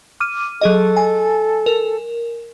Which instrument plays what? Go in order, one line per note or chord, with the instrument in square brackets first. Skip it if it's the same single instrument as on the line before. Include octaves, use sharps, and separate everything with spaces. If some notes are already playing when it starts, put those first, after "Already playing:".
[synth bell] D6 F6 D#7
[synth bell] F#3 G#4 D#5 [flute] A4
[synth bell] G#5
A#4